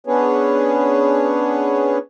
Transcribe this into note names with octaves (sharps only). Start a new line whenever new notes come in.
B3 C#4 D4 G#4 B4 C#5